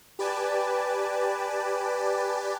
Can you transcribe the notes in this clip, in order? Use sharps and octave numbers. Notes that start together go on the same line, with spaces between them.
G4 B4 D5 G#5 A5